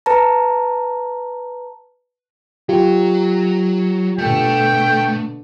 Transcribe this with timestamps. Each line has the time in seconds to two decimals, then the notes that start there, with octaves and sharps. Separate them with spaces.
0.06 B4 A5 A#5
2.69 F#3 F4 G4
4.18 B2 D3 A3 G5